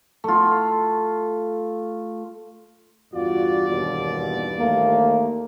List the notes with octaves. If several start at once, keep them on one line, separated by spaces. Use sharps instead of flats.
A3 F4
E2 G2 F4 F#4 D5
D#2 B2
D#2 A3 A#3